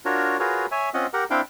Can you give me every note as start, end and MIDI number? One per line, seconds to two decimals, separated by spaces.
0.05 0.37 62
0.05 0.37 65
0.05 0.37 66
0.05 0.37 70
0.05 0.37 73
0.39 0.66 65
0.39 0.66 66
0.39 0.66 68
0.39 0.66 70
0.39 0.66 71
0.39 0.66 73
0.71 0.90 73
0.71 0.90 76
0.71 0.90 80
0.94 1.07 60
0.94 1.07 61
0.94 1.07 65
0.94 1.07 75
0.94 1.07 78
1.13 1.24 67
1.13 1.24 70
1.13 1.24 78
1.30 1.41 60
1.30 1.41 62
1.30 1.41 64
1.30 1.41 77
1.30 1.41 79